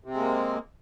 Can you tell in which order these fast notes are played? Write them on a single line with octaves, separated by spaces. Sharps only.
C3 C4 G#3 A#3